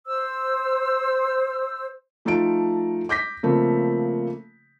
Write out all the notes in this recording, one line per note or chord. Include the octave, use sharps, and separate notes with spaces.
C5 E6
F3 A3 D#4 F4 A5 D7
D6 G6 A#6 B6
C#3 F3 A3 A#3 C4